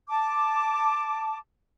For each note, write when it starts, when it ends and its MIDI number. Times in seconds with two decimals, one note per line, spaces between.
0.10 1.36 81
0.10 1.36 86